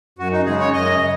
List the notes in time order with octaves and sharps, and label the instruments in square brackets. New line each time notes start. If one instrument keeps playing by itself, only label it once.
[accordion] F#2 F#4
D#4
C#3 G#3 G#4
C#5
F#2 D#5
C#3